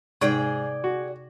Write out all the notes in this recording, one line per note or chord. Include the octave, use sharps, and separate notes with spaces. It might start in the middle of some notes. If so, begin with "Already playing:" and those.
G#2 C3 D#4 G#4 D5 G5 G6
F#4